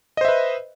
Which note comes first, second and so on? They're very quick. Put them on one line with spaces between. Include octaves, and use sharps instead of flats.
D#5 C5 E5 B4